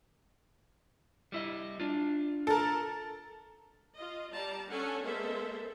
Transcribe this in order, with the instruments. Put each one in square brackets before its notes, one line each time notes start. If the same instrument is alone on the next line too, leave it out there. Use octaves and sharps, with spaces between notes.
[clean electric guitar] G3 E4 D#5
D4 F4
[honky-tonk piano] A4 A#4
[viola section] F4 D#5
G3 D5 A5 A#5
C#4 D4 A4 C#5 F#5 G#5
G#3 A#3 B3 A4 C5 E5